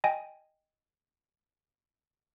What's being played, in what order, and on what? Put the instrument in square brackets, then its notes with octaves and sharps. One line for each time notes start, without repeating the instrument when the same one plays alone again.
[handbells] D#5 G5 G#5